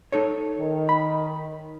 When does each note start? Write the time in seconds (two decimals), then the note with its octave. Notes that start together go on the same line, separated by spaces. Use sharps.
0.12 D#4 A4 C#5
0.59 D#3
0.89 B5